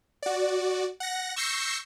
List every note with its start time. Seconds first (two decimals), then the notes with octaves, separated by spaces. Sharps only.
0.23 F#4 D5
1.00 F#5 A#6
1.36 C#6 E6 G6 A#6 C7 C#7